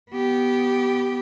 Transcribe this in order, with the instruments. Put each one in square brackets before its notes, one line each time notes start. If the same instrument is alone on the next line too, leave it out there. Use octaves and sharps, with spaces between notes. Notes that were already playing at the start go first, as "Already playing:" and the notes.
[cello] B3 G4